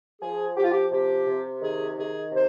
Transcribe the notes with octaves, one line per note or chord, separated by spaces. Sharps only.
F3 G#4
F3 G4
F4
G4
C3 G4
C3
D#3 G#4
D#3 G#4
C3 C5